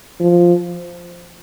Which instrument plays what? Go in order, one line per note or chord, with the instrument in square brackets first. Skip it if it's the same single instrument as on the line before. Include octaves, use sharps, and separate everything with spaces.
[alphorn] F3